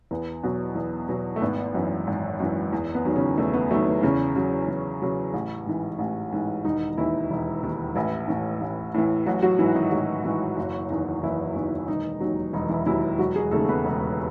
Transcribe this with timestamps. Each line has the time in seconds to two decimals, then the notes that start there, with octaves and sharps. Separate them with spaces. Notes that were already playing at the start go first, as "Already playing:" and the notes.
0.11 E2 B3
0.44 B2 F#3
0.75 E2
1.09 B2 F#3
1.36 A3
1.42 G#1 B3
1.74 F#2 E3
2.07 G#1
2.40 F#2 E3
2.73 E2
2.95 B3
3.05 D#3 F#3
3.16 C#3 C#4
3.38 E2 A3
3.54 B3
3.71 D#3 F#3 A3
3.87 B3
4.03 E2 C#3 C#4
4.36 C#3 F#3
4.68 E2
5.02 C#3 F#3
5.34 A1
5.66 G#2 E3
5.99 A1
6.32 G#2 E3
6.64 E1 D#3 D#4
6.98 D#2 D#3 E3 E4
7.31 E1
7.63 D#2 D#3
7.95 A1 E3 E4
8.28 A2 E3
8.61 A1
8.94 A2 E3
9.26 A1 F#3 F#4
9.42 F#3 F#4
9.59 G#2 E3 E4
9.75 D#3 D#4
9.92 A1 F#3 F#4
10.24 G#2 E3
10.57 F#1
10.90 E2 D#3
11.23 F#1 E3 E4
11.56 E2 D#3
11.88 E1 D#3 D#4
12.20 D#2 D#3 F#3
12.53 E1 D#3 D#4
12.70 E3 E4
12.86 D#2 D#3 E3 F#3 E4
13.19 E1 F#3 F#4
13.36 G#3 G#4
13.51 D#2 C#3 A3 A4
13.68 B3 B4
13.85 E1